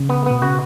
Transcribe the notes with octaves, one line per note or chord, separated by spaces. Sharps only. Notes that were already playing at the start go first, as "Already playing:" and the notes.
Already playing: C#3
B3
B2 B3
C#3 F#4